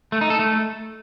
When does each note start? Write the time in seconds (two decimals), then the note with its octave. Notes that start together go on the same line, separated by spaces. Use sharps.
0.12 A3
0.21 D#4
0.30 A4
0.39 A3